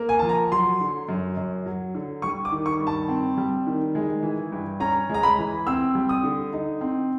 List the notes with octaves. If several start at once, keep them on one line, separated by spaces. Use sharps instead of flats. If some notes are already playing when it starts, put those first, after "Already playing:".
Already playing: A#3
G#5
F3 A5
A#5
F#3 C6
D3
F#2
F#2
F#3
D3
G3 C#6
D6
D#3
C#6
G2
A5
C4
G3
D#3
G#3
E3
G2
C#4 A#5
G#3 A#5
B5
E3
C4 E6
G3
D#6
D3
D#4
C4